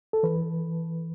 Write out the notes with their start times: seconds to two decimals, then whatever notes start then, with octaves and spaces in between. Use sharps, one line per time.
0.13 A4
0.23 E3 B4